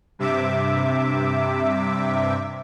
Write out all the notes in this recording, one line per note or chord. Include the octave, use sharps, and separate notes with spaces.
G2 C3 E5 D6